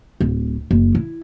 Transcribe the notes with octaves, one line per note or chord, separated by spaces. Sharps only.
D1
F#1
E4